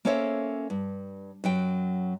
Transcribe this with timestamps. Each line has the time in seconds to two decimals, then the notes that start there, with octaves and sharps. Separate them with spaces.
0.05 A#3 C#4 A4 C5 C#5 E5
0.70 G2
1.44 F#2 F#3 G5